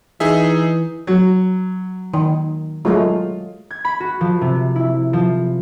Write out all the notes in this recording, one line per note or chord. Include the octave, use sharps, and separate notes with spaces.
E3 D#4 G#4 E5
F#3
D#3
F#3 G#3 A3 F4
G#6
B5
F#4
F3
C3
E4
F3